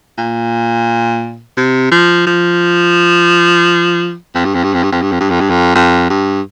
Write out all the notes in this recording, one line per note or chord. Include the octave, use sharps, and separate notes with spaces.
A#2
C3
F3
F3
F2
G2
F2
G2
F2
G2
F2
G2
F2
G2
F2
G2
F2
F2
G2